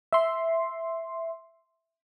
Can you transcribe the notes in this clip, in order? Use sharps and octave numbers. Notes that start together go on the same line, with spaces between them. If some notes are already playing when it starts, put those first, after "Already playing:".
E5 C6